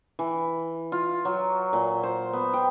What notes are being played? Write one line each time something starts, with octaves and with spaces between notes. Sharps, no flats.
E3
F4
F#3
A#2
C5
B3
G5